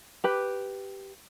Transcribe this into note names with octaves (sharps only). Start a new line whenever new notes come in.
G4 B4